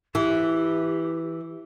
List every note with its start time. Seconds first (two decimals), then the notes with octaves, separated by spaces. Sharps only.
0.15 E3 G4